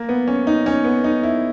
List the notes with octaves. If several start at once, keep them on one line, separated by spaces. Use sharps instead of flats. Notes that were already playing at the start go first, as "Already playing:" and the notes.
Already playing: A#3
B3
C#4
D#4
C#4
B3
D#4
E4